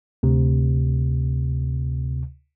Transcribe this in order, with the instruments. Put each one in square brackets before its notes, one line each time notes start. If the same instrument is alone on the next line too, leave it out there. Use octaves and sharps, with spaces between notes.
[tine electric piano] D2 C3